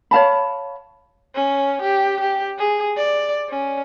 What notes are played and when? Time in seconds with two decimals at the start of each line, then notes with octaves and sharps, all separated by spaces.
0.11 C#5 F5 A5 B5
1.35 C#4
1.82 G4
2.21 G4
2.58 G#4
2.97 D5
3.50 C#4